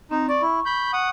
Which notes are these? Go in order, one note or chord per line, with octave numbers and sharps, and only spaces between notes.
C4 D#4
D5 C#6
E4
B5 G6
F#5 D#6